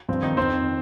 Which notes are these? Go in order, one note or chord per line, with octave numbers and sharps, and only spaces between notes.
G2 F3 C4
D#3 D#4
F2 D#3 C4 C5